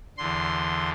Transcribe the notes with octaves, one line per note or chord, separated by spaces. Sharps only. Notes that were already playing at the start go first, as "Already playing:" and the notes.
E2 D3 C6